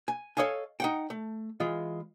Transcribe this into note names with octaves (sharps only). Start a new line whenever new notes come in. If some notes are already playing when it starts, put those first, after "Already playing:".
G#5
A4 C5 C#5 D#5 F5 G#5
D#4 F#5 G5
A3
E3 G#3 F4